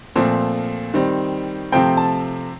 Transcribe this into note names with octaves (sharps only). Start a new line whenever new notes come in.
A#2 F3 A3 C4
D#3 G3 C4
C3 F3 A3 C4 G5
A5